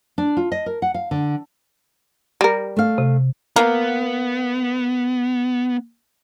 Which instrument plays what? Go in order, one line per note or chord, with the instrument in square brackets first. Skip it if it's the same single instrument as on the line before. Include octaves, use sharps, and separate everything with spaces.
[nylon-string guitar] D4
F4
D#5
A#4
F#5
F5
D3
[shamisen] G3 A#4
[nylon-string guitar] A3 F5
[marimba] C3
[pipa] A#3 [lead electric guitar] B3